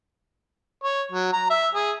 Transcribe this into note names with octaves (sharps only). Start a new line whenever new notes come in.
C#5
F#3
A#5
E5
G#4